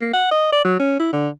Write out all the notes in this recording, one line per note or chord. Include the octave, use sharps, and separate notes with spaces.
A#3
F#5
D#5
D5
F#3
C#4
E4
D3